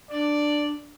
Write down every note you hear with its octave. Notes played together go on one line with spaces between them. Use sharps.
D4 D5